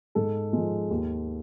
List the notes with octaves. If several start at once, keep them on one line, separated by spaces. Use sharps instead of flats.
G#2 A4
F3 G#3
D#2